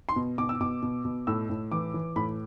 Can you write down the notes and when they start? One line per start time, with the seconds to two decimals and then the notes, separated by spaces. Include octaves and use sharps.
0.09 C6
0.16 B2
0.38 B2 D6
0.49 E6
0.60 B2 D6
0.82 B2
1.05 B2
1.27 A2 E6
1.50 A2
1.72 E3 D6
1.94 E3
2.16 A2 B5